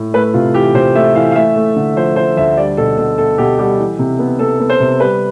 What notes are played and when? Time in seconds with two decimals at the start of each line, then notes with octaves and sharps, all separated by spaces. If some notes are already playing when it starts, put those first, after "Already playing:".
Already playing: A2
0.14 A3 B4
0.34 C3 F4
0.54 E3 G4
0.74 C3 C5
0.95 A3 E5
1.15 E3 F5
1.32 F5
1.35 A3 E5
1.56 A3
1.76 D3
1.96 F3 C5
2.16 F3 C5
2.37 D2 E5
2.57 G3 D5
2.77 B2 A4
2.97 B2 A4
3.18 B2 A4
3.38 B2 G4
3.59 G3 G4
3.78 E3
3.99 C3
4.19 B3
4.39 B3 A4
4.60 B3
4.70 C5
4.80 C3
5.00 G3 B4